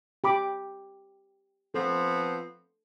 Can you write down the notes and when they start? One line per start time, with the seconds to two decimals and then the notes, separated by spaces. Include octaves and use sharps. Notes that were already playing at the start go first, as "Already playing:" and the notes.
0.24 G4 B5 D6
1.74 F3 B3 C4 A4